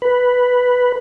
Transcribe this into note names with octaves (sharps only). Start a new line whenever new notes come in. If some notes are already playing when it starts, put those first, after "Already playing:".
B4